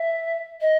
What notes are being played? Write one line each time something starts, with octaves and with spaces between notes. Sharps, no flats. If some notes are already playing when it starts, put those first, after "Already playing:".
Already playing: E5
D#5